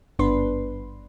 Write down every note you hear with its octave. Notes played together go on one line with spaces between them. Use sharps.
G#1 G2 B3 D4 B4 C6